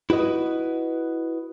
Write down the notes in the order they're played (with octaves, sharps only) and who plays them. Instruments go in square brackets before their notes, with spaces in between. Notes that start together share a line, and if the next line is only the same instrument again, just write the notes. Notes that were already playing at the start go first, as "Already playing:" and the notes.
[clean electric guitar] E4 F#4 B4 D#5